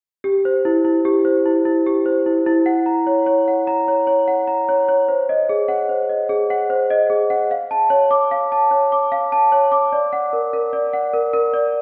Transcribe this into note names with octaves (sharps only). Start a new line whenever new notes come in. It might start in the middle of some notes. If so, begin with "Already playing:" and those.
G4
C5
E4
E4
G4
C5
E4
E4
G4
C5
E4
E4
F#5
A#5
C#5
C#5
F#5
A#5
C#5
C#5
F#5
A#5
C#5
C#5
C5
D#5
G#4
F#5
C5
D#5
G#4
F#5
C5
D#5
G#4
F#5
F5
A5
C#5
D6
F5
A5
C#5
D6
F5
A5
C#5
D6
D5
F#5
A#4
A#4
D5
F#5
A#4
A#4
D5